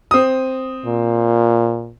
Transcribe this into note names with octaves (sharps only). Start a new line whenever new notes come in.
C4 D#6
A#2